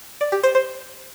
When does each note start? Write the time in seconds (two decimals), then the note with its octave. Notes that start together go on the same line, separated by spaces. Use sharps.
0.21 D5
0.32 G4
0.43 C5
0.55 C5